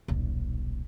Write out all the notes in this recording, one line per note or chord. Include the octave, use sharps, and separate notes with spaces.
D#1 B1